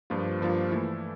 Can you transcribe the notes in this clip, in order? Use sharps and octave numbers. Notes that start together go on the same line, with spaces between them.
G2 F3 A#3 F4
G2 F3 A#3 F4
E3 A3 E4 A4